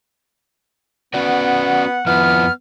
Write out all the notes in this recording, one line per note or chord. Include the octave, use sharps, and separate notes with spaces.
B3 C#4 F#4 D5 F#5
F2 F3 B3 E4 F6